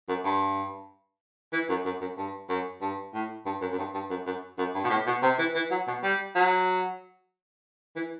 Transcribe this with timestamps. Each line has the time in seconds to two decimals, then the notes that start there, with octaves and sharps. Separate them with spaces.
0.09 F#2
0.24 G2
1.53 E3
1.70 F#2
1.85 F#2
2.01 F#2
2.18 G2
2.49 F#2
2.82 G2
3.14 A2
3.46 G2
3.62 F#2
3.72 F#2
3.79 G2
3.94 G2
4.10 F#2
4.26 F#2
4.58 F#2
4.75 G2
4.84 B2
4.90 A2
5.07 B2
5.23 C3
5.39 E3
5.55 E3
5.71 F#3
5.88 B2
6.04 G3
6.36 F#3
7.96 E3